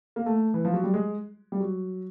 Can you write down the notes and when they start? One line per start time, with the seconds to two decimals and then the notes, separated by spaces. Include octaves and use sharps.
0.16 A#3
0.26 A3
0.54 E3
0.65 F3
0.74 F#3
0.84 G3
0.94 G#3
1.52 G3
1.60 F#3